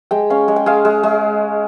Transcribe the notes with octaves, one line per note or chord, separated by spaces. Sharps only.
G#3 G5
C#4 F5
G#3
G5
G#3 F5
G#3
G#3